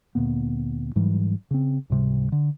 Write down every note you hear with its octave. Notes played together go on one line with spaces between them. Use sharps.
D2 A#2 A#3 B3
G#2 E3 F#3 G3
C#3 C4
C#2 G#2 C3 G3
D3